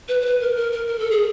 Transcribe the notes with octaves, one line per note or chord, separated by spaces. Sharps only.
B4
C5
B4
A#4
A#4
A#4
A#4
A4
G#4